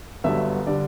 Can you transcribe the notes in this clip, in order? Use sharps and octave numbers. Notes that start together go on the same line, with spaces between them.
G1 G2 D3 F#3 E5
D3 G3 D4 D5